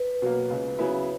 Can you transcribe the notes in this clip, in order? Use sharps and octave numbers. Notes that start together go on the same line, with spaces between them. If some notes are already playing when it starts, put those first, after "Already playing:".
Already playing: B4
B2 F#3 A#3
C#2
C#3 F#3 B3 E4